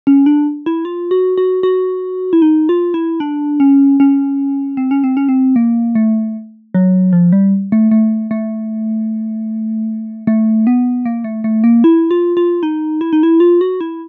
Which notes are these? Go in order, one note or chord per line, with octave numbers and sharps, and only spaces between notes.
C#4
D4
E4
F4
F#4
F#4
F#4
E4
D#4
F4
E4
D4
C#4
C#4
C4
C#4
C4
C#4
C4
A#3
A3
F#3
F3
G3
A3
A3
A3
A3
B3
A#3
A3
A3
A#3
E4
F4
F4
D#4
E4
D#4
E4
F4
F#4
E4